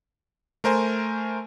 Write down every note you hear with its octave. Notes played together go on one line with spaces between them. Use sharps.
A3 A#4 C5 G#5